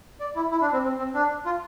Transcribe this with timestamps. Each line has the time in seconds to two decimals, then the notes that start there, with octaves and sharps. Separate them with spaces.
0.20 D5
0.36 E4
0.51 E4
0.62 D4
0.73 C4
0.83 C4
0.98 C4
1.14 D4
1.46 F4